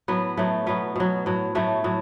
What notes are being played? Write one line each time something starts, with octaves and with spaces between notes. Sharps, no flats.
A2 F#3 B3
A2 F#3 A3
B2 F#3 B3
B2 F#3
A2 F#3
A2 F#3 A3
A2 F#3